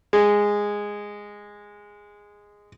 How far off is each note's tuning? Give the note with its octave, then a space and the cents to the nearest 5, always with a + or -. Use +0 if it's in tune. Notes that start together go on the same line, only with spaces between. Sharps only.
G#3 -10